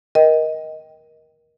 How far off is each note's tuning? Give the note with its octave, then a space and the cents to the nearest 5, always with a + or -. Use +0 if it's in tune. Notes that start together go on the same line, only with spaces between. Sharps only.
A#4 +20 D#5 +15 G5 +0